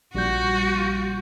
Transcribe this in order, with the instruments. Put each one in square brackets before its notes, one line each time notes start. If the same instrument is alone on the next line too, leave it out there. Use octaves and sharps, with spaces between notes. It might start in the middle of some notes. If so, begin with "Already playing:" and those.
[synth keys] A#1 G3 G6 [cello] F#4